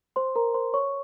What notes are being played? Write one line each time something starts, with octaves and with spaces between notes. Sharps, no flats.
C5 C6
A#4 A#5
C5 C6
C#5 C#6